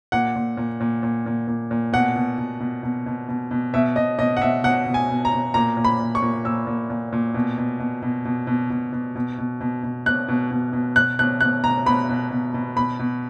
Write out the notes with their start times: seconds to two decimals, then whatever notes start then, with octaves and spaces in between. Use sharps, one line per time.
0.12 A#2 F#5
0.36 A#2
0.57 A#2
0.80 A#2
1.03 A#2
1.26 A#2
1.48 A#2
1.71 A#2
1.93 B2 F#5
2.16 B2
2.38 B2
2.60 B2
2.83 B2
3.06 B2
3.29 B2
3.51 B2
3.74 B2 E5
3.96 B2 D#5
4.19 B2 D#5
4.37 F#5
4.42 B2 E5
4.64 B2 F#5
4.86 B2
4.94 G#5
5.09 B2
5.25 A#5
5.32 B2
5.54 A#2 A#5
5.77 A#2
5.85 B5
5.99 A#2
6.15 C#6
6.22 A#2
6.45 A#2 E6
6.67 A#2
6.90 A#2
7.13 A#2
7.34 B2
7.58 B2
7.79 B2
8.02 B2
8.25 B2
8.47 B2
8.70 B2
8.93 B2
9.15 B2
9.38 B2
9.61 B2
9.83 B2
10.06 B2 F#6
10.28 B2
10.51 B2
10.73 B2
10.96 B2 F#6
11.19 B2 F#6
11.41 B2 F#6
11.64 B2 A#5
11.86 B2 B5
12.09 B2
12.31 B2
12.54 B2
12.76 B2 B5
12.99 B2